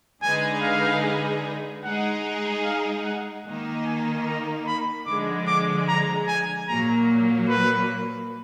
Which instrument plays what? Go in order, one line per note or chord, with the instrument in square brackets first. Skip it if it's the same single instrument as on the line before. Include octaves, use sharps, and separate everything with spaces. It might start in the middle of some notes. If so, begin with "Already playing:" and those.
[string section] D3 G#3 D#4 G#4 B4 [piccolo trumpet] G#5
[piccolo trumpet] F5
[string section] G#3 D#4 G#4 [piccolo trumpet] F#5
[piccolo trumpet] F5
F#5
[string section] D#3 A#3 D#4
[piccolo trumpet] G#5
A#5
B5
[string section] D3 F3 G#3 [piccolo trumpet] D6
[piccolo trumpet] D6
A#5
G#5
[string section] A#2 F#3 A#3 [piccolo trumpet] A#5
[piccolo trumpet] B4